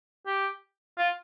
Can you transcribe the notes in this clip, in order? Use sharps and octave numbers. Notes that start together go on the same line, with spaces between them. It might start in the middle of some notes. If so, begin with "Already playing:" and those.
G4
F4